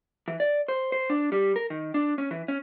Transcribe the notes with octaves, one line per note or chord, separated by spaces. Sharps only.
E3
D5
C5
C5
D4
G3
A#4
D#3
D4
C#4
E3
C#4